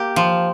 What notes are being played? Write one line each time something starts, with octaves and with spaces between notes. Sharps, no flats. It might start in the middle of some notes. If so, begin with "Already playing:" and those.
Already playing: A#3 G4
F3